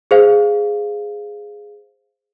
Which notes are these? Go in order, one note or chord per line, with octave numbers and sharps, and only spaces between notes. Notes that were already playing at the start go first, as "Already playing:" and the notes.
G#4 C5 F5